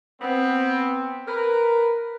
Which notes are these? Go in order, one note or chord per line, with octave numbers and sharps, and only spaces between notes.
B3 C4
A#4 B4